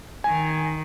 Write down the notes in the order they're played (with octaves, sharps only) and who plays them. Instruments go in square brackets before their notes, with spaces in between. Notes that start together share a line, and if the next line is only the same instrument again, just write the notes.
[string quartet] D#3 [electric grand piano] G#5